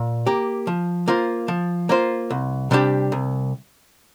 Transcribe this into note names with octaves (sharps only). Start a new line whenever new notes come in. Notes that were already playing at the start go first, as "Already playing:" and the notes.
Already playing: A#2
A#3 G4
F3
A#3 F4 C5
F3
A#3 F4 C5
C2
C3 G3 D4 G4
C2